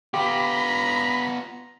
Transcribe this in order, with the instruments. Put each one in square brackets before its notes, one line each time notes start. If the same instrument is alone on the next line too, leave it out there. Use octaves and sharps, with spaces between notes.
[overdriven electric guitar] B3 F4 [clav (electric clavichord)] G4 [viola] A#5 [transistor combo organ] B5